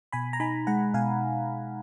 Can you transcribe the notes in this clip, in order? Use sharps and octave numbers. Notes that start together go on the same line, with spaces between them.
B2 G#5 B5
A#5
D#4 G#5 B5
G#3 F#5 A#5
B2 F5 G#5